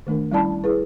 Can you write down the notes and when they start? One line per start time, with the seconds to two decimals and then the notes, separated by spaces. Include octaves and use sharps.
0.07 D#3 A3 D4 A#4
0.32 G3 C#4 E4 D5 A5 B5
0.64 E4 G#4 B4